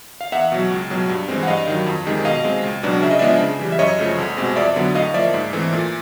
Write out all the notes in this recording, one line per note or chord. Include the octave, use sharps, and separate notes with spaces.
F5
E2 E5 F#5
B2 F#3
C#2
B2 F#3
G2
E3 G#3 C4
F#5
G2 D#5 F5
D#3 F#3
F2
C3 D#3 G#3
B2 D#5 F5
G#3 C4
C#2
B2 F#3 B3 D4
C#3 E5
D#5
F3 G#3 B3 D4 D5 E5
C#3
E3 G3
E5
F#2 C#5 D#5
C#3 F3 A3
C2
B2 G#3 C4
F2 D5 E5
D3 F#3 B3
A2 D#5 F5
F3 A#3 D5 E5
G#2
E3 A3 C4
A#2